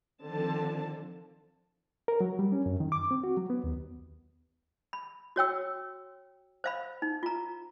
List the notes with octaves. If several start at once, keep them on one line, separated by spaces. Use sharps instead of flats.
D3 D#3 F3 C4 A5
A#4
F#3
G3
C#4
F#2
D#3
D6
C4
F#4
F#3
B3
D#2
B5
F#4 C#5 G5 E6
C5 F5 B5
D#4
F4 A#5